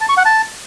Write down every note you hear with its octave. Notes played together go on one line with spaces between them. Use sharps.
A5
C#6
F#5
A5